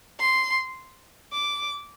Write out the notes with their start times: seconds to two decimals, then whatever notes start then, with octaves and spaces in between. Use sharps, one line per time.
0.20 C6
1.32 D6